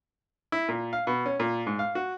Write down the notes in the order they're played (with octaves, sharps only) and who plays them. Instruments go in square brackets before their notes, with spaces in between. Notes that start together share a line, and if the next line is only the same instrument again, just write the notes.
[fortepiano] E4
A#2
F5
B2
C#4
A#2
G#2
F5
F#4